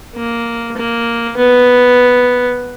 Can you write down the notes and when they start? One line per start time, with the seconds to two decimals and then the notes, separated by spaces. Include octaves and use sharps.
0.16 A#3
0.77 A#3
1.36 B3